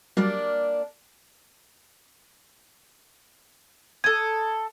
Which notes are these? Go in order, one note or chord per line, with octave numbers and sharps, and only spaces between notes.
F#3 G3 A#3 D4 D5
A4 D#6 G#6